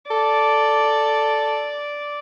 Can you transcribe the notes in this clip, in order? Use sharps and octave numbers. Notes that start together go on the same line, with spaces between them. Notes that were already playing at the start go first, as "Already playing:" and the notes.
A4 D5 D6